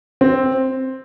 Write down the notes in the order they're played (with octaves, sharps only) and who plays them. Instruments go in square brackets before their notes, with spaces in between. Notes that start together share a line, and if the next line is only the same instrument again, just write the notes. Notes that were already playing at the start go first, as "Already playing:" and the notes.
[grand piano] C4